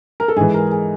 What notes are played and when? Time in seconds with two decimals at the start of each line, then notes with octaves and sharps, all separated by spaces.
0.20 A#4
0.28 A4
0.36 G#2 E3 G#4
0.54 A#4
0.72 G#4